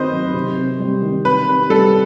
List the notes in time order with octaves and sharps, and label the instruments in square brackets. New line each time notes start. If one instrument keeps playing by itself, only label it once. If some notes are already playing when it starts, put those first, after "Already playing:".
Already playing: [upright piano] D#3 C4 F#4 [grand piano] B4 C5 D#5
[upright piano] F#3
C3
C3
G3
D#3
[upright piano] C3 [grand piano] B4
[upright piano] C3
[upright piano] G3 [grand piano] A4